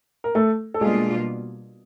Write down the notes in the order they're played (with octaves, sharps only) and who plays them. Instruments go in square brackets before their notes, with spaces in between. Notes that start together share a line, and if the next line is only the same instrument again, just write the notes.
[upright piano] A#4
A3 A4
A4
[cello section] B2 G3 A#3 D4 F4 [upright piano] G#3 G#4